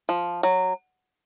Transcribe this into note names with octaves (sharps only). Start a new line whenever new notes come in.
F3
F#3